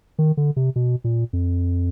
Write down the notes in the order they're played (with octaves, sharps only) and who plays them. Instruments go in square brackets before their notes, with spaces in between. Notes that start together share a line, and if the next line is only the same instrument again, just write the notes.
[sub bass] D#3
D3
C3
B2
A#2
F2